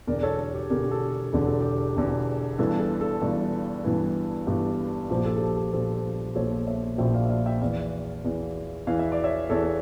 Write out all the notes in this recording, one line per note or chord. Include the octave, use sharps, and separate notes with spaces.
E1 E2 D3 A#4 D5
A4 C#5
A4
G4
E1 E2 D3 G4 A#4
G4
A4
E1 E2 D3 G4
A4
G4
E1 E2 D3
G1 G2 E3 A4
A4
A4
G1 G2 E3
G1 G2 E3
G1 G2 E3 G4
A#1 A#2 F3 G4
A4
A4
G4
A4
A#1 A#2 F3 A4
A#1 A#2 F3 A4 C#5
C#5 E5
A#1 A#2 F3 E5 G5
D5 F5
E5
D5 F5
E5 G5
E2 E3 D5 F5
E2 E3
E2 E3 F5
E5
D5
C#5 E5
E2 E3 A4 C#5